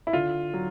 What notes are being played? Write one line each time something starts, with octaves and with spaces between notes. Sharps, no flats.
E4
D3 F4
F#3